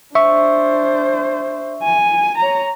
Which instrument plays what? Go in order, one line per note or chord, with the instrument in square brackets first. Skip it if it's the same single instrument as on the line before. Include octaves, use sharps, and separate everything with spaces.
[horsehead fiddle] D4 C5 [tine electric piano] E5 C#6
[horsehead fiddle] G#5
C#5 A#5